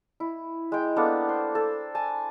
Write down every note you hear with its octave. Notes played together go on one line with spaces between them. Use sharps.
E4
G#3 G5
A#3 B3 D4 A4
C5
A4
G#5 A5